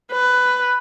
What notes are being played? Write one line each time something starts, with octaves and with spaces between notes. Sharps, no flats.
B4